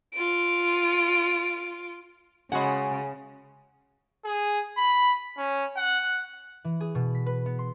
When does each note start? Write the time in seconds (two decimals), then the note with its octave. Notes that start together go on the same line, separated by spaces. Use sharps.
0.13 F4 D7
2.52 C#3 G#3 F#4 F#5 G#5 B5
4.25 G#4
4.77 B5
5.37 C#4
5.77 F#5
6.65 E3
6.80 G#4
6.95 B2
7.15 B6
7.26 B4
7.46 B3
7.59 C6